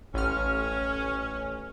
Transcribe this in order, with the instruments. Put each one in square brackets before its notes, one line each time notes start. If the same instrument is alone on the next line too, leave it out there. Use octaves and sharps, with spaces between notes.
[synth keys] A1 F6 [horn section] C#4